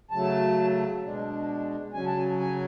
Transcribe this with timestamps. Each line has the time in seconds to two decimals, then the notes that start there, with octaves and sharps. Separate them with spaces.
0.11 C#3 F#3 A3 A5
1.03 B2 G#3 D4
1.94 C#3 F#3 C#4 G#5
2.06 A5
2.17 G#5
2.40 G#5